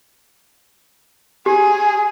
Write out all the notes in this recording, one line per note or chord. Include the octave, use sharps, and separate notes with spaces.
G4 G#4